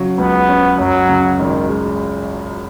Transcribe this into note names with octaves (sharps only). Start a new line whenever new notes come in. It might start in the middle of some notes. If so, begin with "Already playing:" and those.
Already playing: C#3 F#3
C#2 B3
C#4
F#2 F#3
C#3
G#1 D#3
G#3